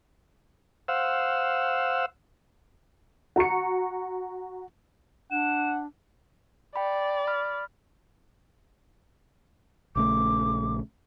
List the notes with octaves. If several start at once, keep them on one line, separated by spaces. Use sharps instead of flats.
C5 F5 F#5 E6
F#4 A#5 C#6 C#7
D4 F#5 E7
D5 G5 B5
B5 F6
A#1 C#3 A3 D6